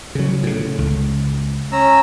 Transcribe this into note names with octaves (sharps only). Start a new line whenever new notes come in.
C#3 F#3
A2 C#3
C#2
C#4 A#5 E6